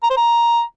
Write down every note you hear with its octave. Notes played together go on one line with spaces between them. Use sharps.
A#5
C5
A#5